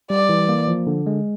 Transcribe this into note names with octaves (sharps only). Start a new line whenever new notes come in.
G3 D5
E3
A#3
F3
D3
G#3